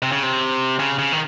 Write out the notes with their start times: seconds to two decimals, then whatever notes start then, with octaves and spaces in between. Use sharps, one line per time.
0.02 C3
0.12 C#3
0.23 C3
0.79 C#3
0.99 C#3
1.12 D#3